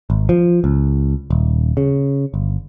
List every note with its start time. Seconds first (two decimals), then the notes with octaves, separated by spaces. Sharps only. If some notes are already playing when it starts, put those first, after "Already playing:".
0.10 G#1
0.29 F3
0.64 C#2
1.30 D#1
1.77 C#3
2.34 G1